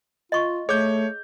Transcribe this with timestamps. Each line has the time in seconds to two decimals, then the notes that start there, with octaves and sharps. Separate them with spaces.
0.32 F4 D#5 C#6
0.69 A3 G#4 C#5 G6